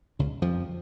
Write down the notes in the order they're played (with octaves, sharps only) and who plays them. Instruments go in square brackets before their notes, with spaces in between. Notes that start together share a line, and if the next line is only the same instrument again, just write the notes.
[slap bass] C#2 C#3
F2 F3